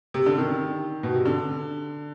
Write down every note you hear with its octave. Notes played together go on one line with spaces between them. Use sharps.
C3
D3
D#3
B2
C3
D3